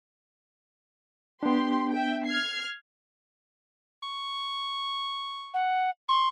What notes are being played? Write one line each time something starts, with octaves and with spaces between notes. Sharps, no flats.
B3 D4 G4 C6
E5 G5
F6 G#6 C7
C#6
F#5
C6 C#6